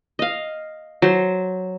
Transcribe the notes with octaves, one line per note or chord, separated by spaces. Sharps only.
D#5 F5
F#3 C5